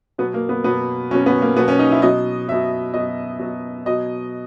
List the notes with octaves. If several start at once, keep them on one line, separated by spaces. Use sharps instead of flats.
B2 F#3 B3
A#3
B3
B2 F#3 B3
B2 F#3 C#4
B3
A#3
B2 F#3 B3
C#4
D#4
E4
B2 F#3 D#5
B2 F#3 E5
B2 F#3 D#5
B2 F#3
B2 F#3 D#5